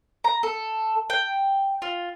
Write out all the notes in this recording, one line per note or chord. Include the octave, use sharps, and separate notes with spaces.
A#5
A4
G5
F4